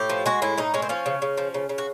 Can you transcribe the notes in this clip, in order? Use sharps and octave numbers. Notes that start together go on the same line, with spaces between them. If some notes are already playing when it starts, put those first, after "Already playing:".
Already playing: A2 G4
F3
G#3 F#4
A2 E4
A2 D#4
G#3 C#4
C4
F3 C#4
C#3
C#3
F3
C#3
C#3
F#4